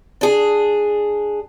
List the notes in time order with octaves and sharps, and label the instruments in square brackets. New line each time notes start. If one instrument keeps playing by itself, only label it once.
[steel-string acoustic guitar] D4 G#4